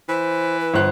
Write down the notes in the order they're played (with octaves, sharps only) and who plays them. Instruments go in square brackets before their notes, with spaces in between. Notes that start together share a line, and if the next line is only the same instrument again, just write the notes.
[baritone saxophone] E3 [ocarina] C5
[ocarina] B4
[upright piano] G1 C5 F#6